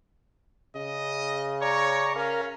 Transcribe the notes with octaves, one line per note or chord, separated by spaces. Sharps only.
C#3 D#5
C#5 D5 A#5 C#6
C#4 A#4 F5